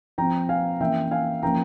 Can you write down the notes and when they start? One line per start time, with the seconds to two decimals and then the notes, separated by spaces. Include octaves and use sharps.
0.18 F3 C4 G5 A#5
0.49 F5 G#5
0.80 E3 A#3 C#4 E5 G5
1.11 F5 G#5
1.42 F3 A#3 C#4 G5 A#5